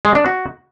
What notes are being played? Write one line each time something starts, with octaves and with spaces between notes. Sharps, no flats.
G#3
D4
F#4